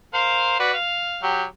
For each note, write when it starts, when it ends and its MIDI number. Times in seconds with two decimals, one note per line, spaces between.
0.14 0.57 70
0.14 0.57 72
0.14 0.57 77
0.60 0.73 66
0.60 0.73 71
0.60 0.73 74
0.74 1.22 77
1.23 1.44 54
1.23 1.44 67